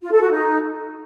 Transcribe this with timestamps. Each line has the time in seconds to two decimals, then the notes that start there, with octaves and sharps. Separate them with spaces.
0.02 F4
0.11 A4
0.21 F#4
0.31 D#4